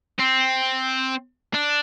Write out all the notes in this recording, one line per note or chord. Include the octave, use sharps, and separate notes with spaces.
C4
D4